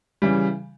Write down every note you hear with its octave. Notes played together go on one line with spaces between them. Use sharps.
C#3 E3 G3